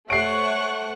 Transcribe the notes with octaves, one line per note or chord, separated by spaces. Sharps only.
A3 C5 C#5 F#5 C#6 F#6 C7 D7